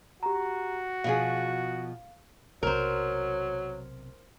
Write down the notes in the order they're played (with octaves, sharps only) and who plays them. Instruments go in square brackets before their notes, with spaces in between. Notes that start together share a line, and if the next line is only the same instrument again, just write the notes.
[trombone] F#4 [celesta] G4 A#5
[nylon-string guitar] B2 F3 G#4 [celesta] F5
[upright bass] B1 C3 [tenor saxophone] F#3 [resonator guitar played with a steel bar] A#4 C5